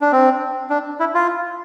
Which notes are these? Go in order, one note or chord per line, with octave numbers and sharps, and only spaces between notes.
D4
C4
D4
E4
F4